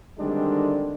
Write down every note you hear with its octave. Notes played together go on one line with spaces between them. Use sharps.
D3 D#3 G3 G#3 C4 D4